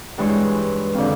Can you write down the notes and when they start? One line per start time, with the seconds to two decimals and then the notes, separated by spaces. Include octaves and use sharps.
0.18 G2 E3 G#3 C#5 C6
0.94 F2 D3